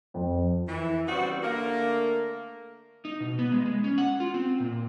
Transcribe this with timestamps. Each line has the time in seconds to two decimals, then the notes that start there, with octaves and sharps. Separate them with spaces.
0.14 F2
0.68 E3
1.06 C#3 G3 B3 C4 F#4
1.43 D3 A3 A#3
3.05 D#4
3.20 B2
3.39 B3
3.52 G#3
3.66 G#3
3.84 C#4
3.98 F#5
4.20 F4
4.34 C4
4.60 A#2